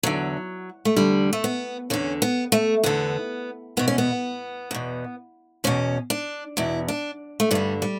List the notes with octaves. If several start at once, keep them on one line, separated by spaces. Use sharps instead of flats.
E2 D3 F#3
A3
E2 D3 G3
A3
B3
E2 D3 C#4
B3
A3
E2 D3 B3
E2 B2 B3
C#4
B3
E2 B2
E2 B2 C#4
D4
E2 B2 E4
D4
A3
G2 D3 G3
G3